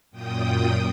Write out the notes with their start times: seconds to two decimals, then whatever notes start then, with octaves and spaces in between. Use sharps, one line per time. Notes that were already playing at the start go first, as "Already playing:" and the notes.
0.11 F#2 A#2 G5 D#6